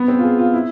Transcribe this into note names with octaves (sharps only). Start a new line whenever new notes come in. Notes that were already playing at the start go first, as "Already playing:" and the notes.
Already playing: B3
C4
F4
G#4
F4
E4